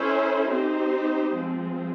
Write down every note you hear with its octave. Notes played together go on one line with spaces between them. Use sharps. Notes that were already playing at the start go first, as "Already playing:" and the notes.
Already playing: C#4 E4 A4 C5
C4 D#4 G4 C5
F3 G#3 C4